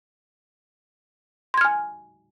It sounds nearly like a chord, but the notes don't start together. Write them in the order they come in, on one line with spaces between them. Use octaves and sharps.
C6 G#6 F6 G#5